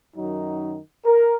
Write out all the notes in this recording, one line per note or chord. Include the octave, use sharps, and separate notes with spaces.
F#2 D#3 F#3 D#4
A#4